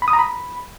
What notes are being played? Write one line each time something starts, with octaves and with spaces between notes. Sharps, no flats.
B5
D#6
A#5
B5